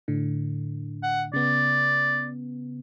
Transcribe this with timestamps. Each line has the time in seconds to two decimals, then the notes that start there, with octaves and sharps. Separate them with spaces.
0.08 A2 D3
1.03 F#5
1.33 C#3 B3 D5